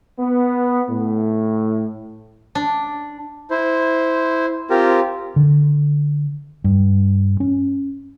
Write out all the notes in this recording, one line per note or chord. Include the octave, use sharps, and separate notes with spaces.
B3
A2
D4
E4 C5
C4 F4 G4 A#4
D3
G2
C#4